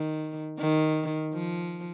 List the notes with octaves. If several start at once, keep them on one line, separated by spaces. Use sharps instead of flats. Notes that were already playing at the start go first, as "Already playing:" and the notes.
Already playing: D#3
D#3
F3